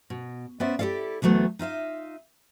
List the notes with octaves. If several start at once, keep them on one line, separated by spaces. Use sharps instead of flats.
B2
B3 C#4 C5 D5 E5
E4 G4 A4 D5 F5
D2 E3 F#3 A3 B3
D#4 F4 E5 F5